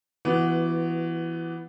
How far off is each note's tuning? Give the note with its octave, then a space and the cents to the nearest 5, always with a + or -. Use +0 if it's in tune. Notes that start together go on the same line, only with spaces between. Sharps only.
E3 +20 B3 +5 F#4 +0